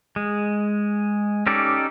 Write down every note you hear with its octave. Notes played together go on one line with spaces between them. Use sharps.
G#3
C#4 D#4 G4 A4 D5